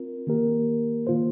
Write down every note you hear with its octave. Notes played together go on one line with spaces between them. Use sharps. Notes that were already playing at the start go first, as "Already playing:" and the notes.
Already playing: C4 F4 A#4
D#3 A#3 G4 A#4
D#3 A#3 F4 C5